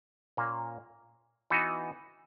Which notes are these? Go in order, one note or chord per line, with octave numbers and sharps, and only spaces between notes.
A#2 A#3 C#4
E3 B3 D#4 F#4